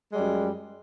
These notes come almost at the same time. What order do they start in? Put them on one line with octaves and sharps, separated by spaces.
G#3 G3 F#2